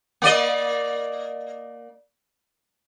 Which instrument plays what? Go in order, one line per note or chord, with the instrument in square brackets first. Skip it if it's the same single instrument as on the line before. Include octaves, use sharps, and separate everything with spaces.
[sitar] A#3 D5 D#5